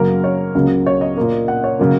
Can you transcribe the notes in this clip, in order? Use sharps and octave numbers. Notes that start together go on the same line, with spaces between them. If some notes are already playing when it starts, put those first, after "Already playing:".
Already playing: F#2 C#3 F#3 A#3 A#4
C#5
C#2 C#3 F#3 A#3
C#5
D#5
A#2 A#3
F#5
C#5
C#3 F#3 A#3